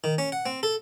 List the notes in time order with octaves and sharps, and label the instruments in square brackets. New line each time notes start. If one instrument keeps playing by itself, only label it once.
[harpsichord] D#3
C#4
F#5
C4
A4